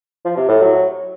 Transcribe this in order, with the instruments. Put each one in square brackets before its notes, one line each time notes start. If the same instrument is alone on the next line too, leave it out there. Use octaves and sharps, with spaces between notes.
[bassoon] F3
C3
A2
F#3